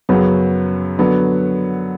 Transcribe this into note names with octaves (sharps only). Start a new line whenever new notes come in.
F#2 C#3 F#3 B3
D3 F#3 B3